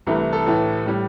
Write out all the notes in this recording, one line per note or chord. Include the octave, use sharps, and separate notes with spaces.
C2 C3 E3 A3
A4
A2 E3 A3
A2 G3